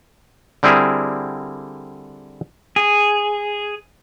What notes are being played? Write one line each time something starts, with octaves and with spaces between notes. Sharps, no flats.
D3 G3 C4 E4 G#4 A#4
G#4